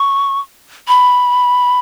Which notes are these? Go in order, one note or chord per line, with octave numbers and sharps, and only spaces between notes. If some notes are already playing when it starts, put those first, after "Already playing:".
Already playing: C#6
B5